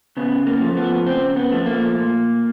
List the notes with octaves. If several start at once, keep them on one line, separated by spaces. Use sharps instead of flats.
C#3 B3
A#3
F3 A3
B3
C#3 C4
B3
F3 A3
A#3
A#2